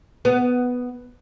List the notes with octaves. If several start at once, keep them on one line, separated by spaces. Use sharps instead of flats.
B3